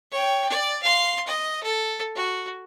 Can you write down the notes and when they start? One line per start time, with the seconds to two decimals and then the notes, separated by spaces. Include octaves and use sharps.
0.11 C#5 G5
0.49 D5
0.83 F5 C6
1.26 D#5
1.62 A4
2.15 F#4